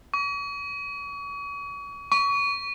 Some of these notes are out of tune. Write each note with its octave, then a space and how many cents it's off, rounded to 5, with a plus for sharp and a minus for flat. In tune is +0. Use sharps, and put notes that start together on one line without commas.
C#6 +40
C#6 +30